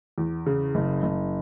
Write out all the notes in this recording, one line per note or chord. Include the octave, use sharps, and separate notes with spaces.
E2
C#3
F#1
F#1